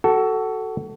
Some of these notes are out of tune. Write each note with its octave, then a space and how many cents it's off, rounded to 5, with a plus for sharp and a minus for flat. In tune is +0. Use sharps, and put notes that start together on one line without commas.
F#4 +25 A4 +0